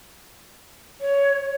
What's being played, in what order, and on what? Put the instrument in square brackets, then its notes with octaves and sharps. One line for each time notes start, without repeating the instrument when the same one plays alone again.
[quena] C#5